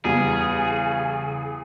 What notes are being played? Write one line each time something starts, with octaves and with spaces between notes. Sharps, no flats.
E2 C#3 G3 G#4